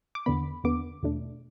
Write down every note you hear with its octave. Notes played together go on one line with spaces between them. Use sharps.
D6
E2 D3 B3 B5
E2 D3 B3 D6
E2 B2 A3 D4